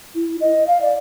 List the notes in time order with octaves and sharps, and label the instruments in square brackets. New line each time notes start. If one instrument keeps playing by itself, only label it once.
[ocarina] E4
D#5
F5
D5